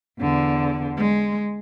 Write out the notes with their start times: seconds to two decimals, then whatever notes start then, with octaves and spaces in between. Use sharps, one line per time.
0.20 E2 D3
0.97 G#3